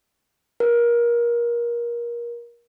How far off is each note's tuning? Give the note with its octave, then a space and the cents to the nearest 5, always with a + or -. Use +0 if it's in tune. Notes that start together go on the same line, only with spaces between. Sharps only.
A#4 +25